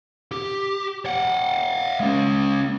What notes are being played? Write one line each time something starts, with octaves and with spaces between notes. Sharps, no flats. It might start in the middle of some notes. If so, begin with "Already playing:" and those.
G4
F5 F#5
G#3 C#4